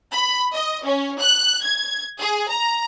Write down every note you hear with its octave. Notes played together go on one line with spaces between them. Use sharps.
B5
D#5
C#4
F#6
G#6
G#4
A#5